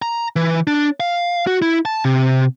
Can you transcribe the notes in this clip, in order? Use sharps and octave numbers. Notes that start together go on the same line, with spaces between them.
A#5
E3
D4
F5
F#4
E4
A5
C3